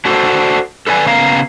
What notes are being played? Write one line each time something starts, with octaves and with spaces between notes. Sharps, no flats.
D4 F#4 A4 C5
A4 B4 D5 G#5
C#3 B3 F5 A#5